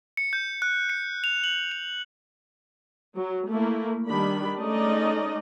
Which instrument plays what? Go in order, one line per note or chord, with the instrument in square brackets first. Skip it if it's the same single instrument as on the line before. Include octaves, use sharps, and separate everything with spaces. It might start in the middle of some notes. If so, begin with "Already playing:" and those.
[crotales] C#7
G6
F#6
C#7
F7
F#7
F7
[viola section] F#3
A3 A#3 E4
D#3 G3 D4 B5
G#3 A3 C#4 D#4 D5 D#5